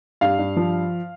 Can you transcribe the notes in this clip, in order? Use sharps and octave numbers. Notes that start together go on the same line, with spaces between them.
G2 F5
G2
F3